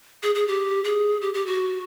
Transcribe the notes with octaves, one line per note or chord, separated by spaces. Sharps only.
G#4
G#4
G4
G#4
G4
G4
F#4